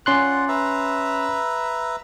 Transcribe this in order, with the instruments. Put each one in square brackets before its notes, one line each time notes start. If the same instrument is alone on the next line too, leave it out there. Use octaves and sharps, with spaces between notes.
[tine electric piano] C#4 C6 F#6 [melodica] F4 D5 F#5
[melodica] B4 E5 A#5